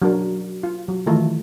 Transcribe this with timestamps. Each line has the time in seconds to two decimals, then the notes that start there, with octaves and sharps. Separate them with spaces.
0.02 F#3 D4 A#4
0.63 F4
0.88 F#3
1.06 D#3 E3 A3 F4